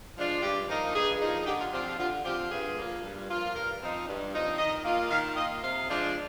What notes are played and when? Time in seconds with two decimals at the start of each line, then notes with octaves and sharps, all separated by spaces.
0.16 F3 G#3 D4 F4
0.42 G2 G4
0.68 F3 A#3 D#4
0.95 G2 G#4
1.21 F3 A#3 D#4
1.46 D3 G4
1.60 F4
1.73 F3 C4 F4 G4
1.86 G4
1.99 D3 F4
2.25 F3 C4 F4 G4
2.50 G2 G#4
2.77 F3 A#3 F4
3.03 G2
3.29 F3 A#3 F4
3.55 G2 A#4
3.81 F3 C4 D#4
4.07 G2
4.33 F3 C4 D#4
4.59 D#3 D#5
4.85 A#3 F4
5.11 D#3 F5
5.37 A#3 D#5
5.40 F4
5.63 C3 F5
5.89 F3 G#3 D4